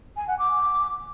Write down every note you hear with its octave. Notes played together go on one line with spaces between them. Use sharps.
G#5
F#5
D6